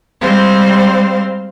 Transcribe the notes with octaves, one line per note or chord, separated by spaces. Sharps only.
G3 G#3 C4 C5 F5